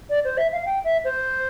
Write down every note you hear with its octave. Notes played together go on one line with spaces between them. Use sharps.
D5
C5
E5
F5
G5
E5
C5